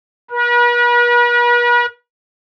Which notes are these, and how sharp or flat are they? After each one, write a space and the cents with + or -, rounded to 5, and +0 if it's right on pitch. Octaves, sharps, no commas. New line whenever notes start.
B4 -45